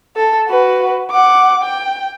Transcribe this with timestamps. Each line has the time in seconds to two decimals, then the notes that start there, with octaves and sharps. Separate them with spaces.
0.17 A4
0.48 F#4 B4
1.11 F#5 D6
1.62 G5